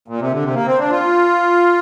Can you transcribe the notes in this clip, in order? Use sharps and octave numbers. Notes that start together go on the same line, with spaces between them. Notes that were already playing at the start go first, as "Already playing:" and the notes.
A#2
C3
D3
C3
A#3
C4
D4
F4